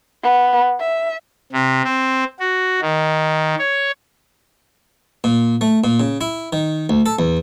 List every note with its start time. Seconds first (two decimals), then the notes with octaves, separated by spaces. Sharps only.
0.24 B3
0.80 E5
1.52 C3
1.85 C4
2.40 F#4
2.81 D#3
3.59 C#5
5.24 A#2
5.61 A3
5.84 A#2
6.00 C#3
6.21 E4
6.53 D#3
6.89 D2
7.06 A4
7.19 E2